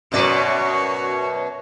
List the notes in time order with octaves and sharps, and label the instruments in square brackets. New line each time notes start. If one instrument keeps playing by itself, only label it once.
[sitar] F#2 B2 D5 [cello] F#4 C#5